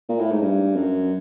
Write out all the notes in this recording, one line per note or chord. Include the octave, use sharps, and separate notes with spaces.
A#2
A2
G#2
G2
F#2